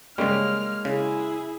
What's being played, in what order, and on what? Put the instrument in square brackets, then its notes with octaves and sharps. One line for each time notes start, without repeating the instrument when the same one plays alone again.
[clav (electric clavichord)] C#3 G3 [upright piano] G#3 A#3 C#4 [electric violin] F6
[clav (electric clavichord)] C#3 [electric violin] E4 G#4